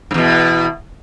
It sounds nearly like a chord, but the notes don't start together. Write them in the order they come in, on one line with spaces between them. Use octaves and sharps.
G#2 E2 B2